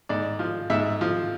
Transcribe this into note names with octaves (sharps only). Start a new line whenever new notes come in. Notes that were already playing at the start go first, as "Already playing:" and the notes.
G#2 D5
F3
G#2 E5
F3